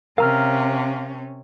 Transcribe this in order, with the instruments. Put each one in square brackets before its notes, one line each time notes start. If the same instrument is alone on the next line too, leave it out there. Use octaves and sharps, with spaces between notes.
[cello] C3 C#4 [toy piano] A#4 [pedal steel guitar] F5 A#5 F6